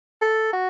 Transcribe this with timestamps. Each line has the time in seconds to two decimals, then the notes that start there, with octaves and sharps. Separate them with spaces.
0.22 A4
0.53 F#4